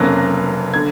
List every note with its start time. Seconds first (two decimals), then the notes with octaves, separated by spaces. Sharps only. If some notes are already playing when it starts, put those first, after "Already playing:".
Already playing: F1 F2 C#3 F#3 A#3 A#6
0.74 D3 G#6